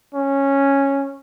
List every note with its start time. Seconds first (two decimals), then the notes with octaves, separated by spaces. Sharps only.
0.14 C#4